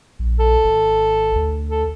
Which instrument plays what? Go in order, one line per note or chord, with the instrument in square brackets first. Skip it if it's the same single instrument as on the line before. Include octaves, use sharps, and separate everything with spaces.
[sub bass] A#1
[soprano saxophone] A4
[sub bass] G#1
D2
[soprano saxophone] A4